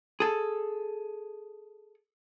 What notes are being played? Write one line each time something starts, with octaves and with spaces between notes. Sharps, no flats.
G#4 A4